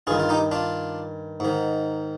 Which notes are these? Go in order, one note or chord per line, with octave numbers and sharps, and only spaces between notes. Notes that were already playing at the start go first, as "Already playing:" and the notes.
G2 D#3 F4 G#4
F4
D#4 G4
D4 F4
G#2 D#3